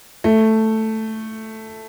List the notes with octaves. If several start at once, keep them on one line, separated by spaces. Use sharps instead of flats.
A3